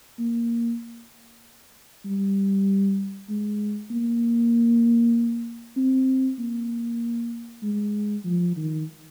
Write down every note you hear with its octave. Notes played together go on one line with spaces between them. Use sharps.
A#3
G3
G#3
A#3
C4
A#3
G#3
F3
D#3